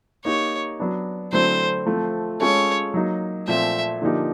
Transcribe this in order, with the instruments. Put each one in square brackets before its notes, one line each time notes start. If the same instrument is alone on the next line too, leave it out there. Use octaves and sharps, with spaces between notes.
[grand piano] A#3 D#4 G4 [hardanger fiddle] C#5
[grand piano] F#3 B3 D4
[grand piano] D3 F#3 A3 C4 E4 [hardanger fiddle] C5
[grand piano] F3 A3 C4
[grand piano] G#3 C#4 F4 A4 [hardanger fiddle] C#5
[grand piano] F#3 A#3 D#4
[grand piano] A#2 F3 A3 C4 [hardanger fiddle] E5
[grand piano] D3 F3 A#3 D#4 G4